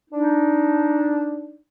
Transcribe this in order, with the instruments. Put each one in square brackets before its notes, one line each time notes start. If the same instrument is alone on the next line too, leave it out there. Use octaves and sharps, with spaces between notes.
[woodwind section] D4 D#4